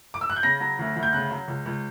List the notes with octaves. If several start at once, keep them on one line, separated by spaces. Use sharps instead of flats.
D6
E6
F#6
G6
C#3 A#6
F#3
D2
D2
G6
C#3 F#6
F#3
C#2
C#2